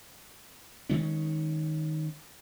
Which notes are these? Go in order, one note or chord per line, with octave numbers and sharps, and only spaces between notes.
D#3 G#3 C#4